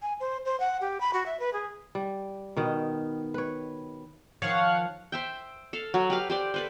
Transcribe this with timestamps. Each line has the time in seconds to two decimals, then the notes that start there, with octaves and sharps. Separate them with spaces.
0.02 G#5
0.20 C5
0.45 C5
0.60 F#5
0.81 G4
1.01 B5
1.13 F#4
1.26 E5
1.39 B4
1.53 G#4
1.95 G3
2.56 B2 D#3 B3 D#5
3.34 B4 C#5
4.42 D#3 F3 C#5 F5 F#5
5.12 C5 E5 G5
5.73 A4 F5
5.94 F#3
6.10 G4 B4 F5
6.30 G4 C5 D5
6.54 A4 B4 C5